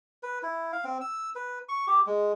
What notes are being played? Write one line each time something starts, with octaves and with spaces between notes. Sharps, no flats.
B4
E4
F5
C4
E6
B4
C#6
G4
G#3